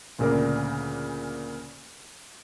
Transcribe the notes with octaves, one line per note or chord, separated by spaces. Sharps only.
D2 A#2 C#3 A#4 D5